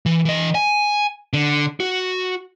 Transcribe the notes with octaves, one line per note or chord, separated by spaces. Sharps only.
E3
E3 D#5
G#5
D3
F#4